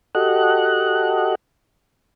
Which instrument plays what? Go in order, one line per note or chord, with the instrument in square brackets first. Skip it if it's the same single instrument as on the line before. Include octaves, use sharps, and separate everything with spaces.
[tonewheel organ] F#4 G4 A4 D#5 F#5 F#6